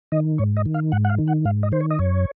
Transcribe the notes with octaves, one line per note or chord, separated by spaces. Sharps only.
D#3 D#5
G#2 C#5
D#5
D#3
F5
G#2 F#5
F#5
F5
D#3
F#5
G#2 F5
D#5
D#3 C5
C#5
D#5
F#2 C#5